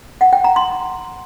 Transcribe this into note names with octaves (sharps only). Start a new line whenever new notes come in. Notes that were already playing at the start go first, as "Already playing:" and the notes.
F#5
G5
A#5
C6